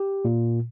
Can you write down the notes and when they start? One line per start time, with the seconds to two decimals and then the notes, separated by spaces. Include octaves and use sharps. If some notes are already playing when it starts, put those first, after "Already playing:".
Already playing: G4
0.25 A#2